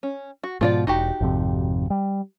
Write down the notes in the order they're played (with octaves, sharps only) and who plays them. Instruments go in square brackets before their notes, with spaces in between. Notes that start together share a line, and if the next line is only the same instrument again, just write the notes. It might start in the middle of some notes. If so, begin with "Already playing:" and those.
[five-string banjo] C#4
F#4
[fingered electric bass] G#2 B2 [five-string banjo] F3 F4 D5
[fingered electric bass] E1 [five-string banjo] D#4 F#4 G4
[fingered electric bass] G#1 F2 C3
G3